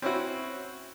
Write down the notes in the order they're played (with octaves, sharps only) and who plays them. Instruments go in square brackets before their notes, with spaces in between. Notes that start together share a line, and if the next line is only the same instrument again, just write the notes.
[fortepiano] C4 C#4 E4 F#4